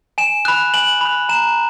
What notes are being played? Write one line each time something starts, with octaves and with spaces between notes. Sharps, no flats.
G#5 E7
B5 F#6
G#5 F#7
B5 F#6
A#5 E7